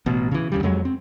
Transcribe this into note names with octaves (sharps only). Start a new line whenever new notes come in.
A1 B2
C#3 E3
D2 C#3 G3
F2 F#3 G#3
C4